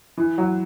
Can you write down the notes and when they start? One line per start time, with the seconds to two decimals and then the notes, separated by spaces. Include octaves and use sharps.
0.17 E3
0.38 F#3